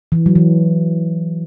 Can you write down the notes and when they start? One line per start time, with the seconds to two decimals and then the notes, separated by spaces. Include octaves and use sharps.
0.12 E3
0.26 F#3
0.35 E3